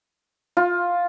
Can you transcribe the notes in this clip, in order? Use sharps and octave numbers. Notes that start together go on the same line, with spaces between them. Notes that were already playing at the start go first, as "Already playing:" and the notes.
F4